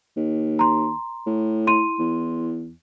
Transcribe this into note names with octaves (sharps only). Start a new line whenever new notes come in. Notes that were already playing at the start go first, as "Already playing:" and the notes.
D#2
A#5 C6
A2
E4 C6 D#7
E2